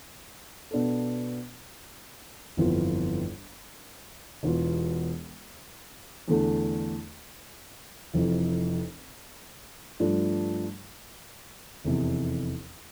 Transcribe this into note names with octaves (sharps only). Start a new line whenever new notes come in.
B2 B3 D4 A4
G1 F2 E3 B3 F4
E1 E2 B2 B3 F4
E2 D3 A3
F1 F2 E3
G2 F3 A3 D4
F1 E2 C3